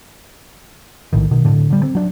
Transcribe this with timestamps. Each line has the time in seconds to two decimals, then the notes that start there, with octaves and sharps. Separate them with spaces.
1.13 A#1 A2 D#3
1.31 B2 D#3
1.45 A2 D3
1.70 D3 G3
1.83 C4
1.95 F#3 D4